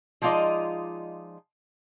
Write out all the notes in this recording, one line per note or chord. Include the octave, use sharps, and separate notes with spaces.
F3 G#3 D#4 F4 D5 D#5